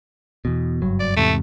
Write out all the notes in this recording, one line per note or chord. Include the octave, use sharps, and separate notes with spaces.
E2 B2
F#1 G2 F#3
D5
E2 G#2 C3 A3